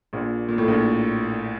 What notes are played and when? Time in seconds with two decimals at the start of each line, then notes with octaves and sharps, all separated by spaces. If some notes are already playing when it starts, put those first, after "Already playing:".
0.13 A#1 A#2
0.49 A#2
0.58 A2
0.68 A#1 A#2